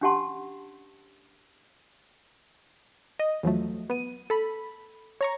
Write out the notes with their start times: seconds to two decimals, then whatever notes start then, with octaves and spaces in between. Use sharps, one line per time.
0.01 C#4 D4 G4 F#5 A5 C6
3.19 D#5
3.43 E2 F3 F#3 A3
3.90 B3 D#7
4.30 A4 B5
5.21 C#5 A#5 C#6